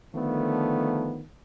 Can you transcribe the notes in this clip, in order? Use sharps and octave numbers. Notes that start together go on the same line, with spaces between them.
D3 D#3 F3 A3 B3